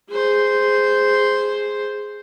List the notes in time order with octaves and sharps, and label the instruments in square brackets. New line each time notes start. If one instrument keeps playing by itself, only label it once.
[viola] G#4 C5